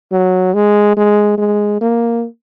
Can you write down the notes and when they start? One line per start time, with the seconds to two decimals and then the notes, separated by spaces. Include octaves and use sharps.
0.11 F#3
0.54 G#3
0.96 G#3
1.38 G#3
1.81 A#3